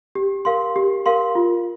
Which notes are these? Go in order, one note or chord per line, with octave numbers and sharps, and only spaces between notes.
G4
A#4 F5 C6
G4
A#4 F5 C6
F4